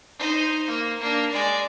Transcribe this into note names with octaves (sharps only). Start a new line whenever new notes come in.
D#4 C5
A#3
A#3 D4
G#3 D5